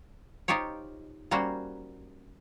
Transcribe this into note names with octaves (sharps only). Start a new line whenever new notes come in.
D#4 F4 G4 C5 C#5
G3 A#3 C#4 F#4 C5